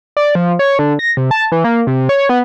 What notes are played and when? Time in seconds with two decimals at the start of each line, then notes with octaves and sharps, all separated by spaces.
0.17 D5
0.35 F3
0.59 C#5
0.79 D3
0.99 A#6
1.17 C3
1.31 A5
1.52 E3
1.64 A#3
1.87 C3
2.09 C#5
2.29 B3